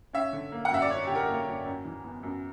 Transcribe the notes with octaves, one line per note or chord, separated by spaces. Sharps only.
C#4 E5
D3
A#3
F#5
F#2 E5
D5
C#4 C#5
D3 G4
A#4
A#3
F#2
F#2
E3
B3
F#2